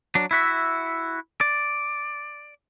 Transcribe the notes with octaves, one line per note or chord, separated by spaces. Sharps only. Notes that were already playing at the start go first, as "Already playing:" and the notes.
F#3 D4
E4 F#4 E5
D5